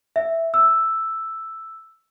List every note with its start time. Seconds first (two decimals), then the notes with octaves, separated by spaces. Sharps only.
0.16 E5
0.54 E6